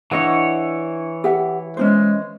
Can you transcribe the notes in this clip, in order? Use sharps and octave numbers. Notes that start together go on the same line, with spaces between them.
E3 D4 E4 C#5 D#5 F#5
G4 E5 F#5
G#3 C#4 D4 C5